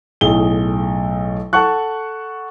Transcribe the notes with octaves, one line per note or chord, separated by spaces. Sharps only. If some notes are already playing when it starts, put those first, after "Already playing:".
B1 A2 G#4 G7
A4 F#5 A5 C#6 F#6